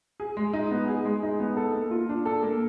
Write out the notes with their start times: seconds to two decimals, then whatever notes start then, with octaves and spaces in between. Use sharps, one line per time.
0.20 G#4
0.37 G#3
0.53 D#4
0.71 B3
0.88 G#4
1.05 G#3
1.23 D#4
1.40 B3
1.57 A4
1.75 A#3
1.91 F4
2.09 D4
2.26 A4
2.43 A#3